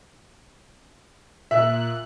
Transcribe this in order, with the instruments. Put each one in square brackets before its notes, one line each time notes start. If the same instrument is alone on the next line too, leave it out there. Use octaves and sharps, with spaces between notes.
[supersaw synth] A#2 F#6 [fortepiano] E5